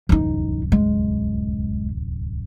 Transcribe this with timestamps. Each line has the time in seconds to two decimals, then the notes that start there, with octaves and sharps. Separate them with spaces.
0.09 D1 C2 F#2 E3 D#4
0.72 G#3